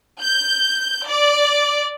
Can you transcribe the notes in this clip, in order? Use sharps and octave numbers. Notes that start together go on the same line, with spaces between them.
G6
D5